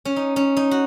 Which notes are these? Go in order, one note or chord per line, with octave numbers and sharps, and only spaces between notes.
C#4
D#4
C#4
D#4
F#4